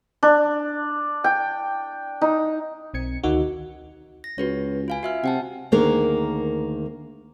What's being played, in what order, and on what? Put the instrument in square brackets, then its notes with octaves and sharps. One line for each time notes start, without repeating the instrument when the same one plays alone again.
[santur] D4
G5
D#4
[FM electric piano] B1 C4 G#6 C#7
D2 D#3 D#4 F#4
[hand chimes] A#6
[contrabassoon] C#2 [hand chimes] F#4 B4 C#5
[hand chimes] F4 F5 G#5
F#4 E5 F6
[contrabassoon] C3 [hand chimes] F#5 G5 A5
[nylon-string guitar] D2 D#3 A#3 G#4 A#4